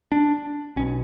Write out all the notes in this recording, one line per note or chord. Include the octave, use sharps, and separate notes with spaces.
D4
B1 B2 C#4